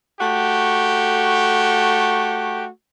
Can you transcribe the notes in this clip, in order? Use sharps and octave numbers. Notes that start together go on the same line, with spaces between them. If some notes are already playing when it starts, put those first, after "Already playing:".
A3 F#4 G4